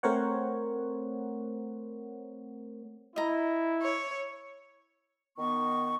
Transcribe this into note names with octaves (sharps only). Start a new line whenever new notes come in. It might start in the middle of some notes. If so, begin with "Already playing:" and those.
A3 C4 A#4 C5 C#5 F#5
E4 D#5 A#5
C#5
D#3 B3 C#6